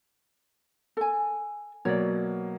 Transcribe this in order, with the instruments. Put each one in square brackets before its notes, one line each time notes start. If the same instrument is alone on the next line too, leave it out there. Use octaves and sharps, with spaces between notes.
[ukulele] A4 G#5
[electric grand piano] B2 F#3 A#3 [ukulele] C#5 D5